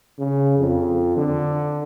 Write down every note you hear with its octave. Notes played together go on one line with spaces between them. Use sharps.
C#3
F2
D3